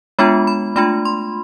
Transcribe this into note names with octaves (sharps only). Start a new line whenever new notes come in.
G#3 B3 D4 F4 B5
B5
A3 D4 F4 B5
C6